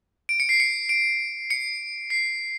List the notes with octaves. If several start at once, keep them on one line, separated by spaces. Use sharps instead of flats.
D7
C#7
C7
C#7
D7
C#7
C7